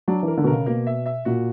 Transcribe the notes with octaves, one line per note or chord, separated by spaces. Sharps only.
F#3 D4
E3 A#4
D3
B2
A#4
C#3
B2 A#3
E5
E5
A#2 F#4